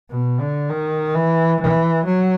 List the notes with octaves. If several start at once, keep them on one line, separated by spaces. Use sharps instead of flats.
B2
D3
D#3
E3
E3
F#3